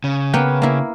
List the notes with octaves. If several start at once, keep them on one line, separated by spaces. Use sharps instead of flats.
C#3
A#3 B3 G5
A#3 E4